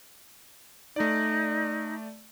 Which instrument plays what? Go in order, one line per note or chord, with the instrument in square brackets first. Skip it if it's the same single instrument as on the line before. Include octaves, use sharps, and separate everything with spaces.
[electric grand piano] A3 D5 [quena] D#4